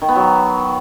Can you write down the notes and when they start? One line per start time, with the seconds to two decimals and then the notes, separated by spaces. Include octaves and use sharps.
0.02 D#3
0.08 B3
0.15 F#3